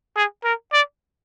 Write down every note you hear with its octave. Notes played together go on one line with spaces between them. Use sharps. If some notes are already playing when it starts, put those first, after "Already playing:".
G#4
A#4
D5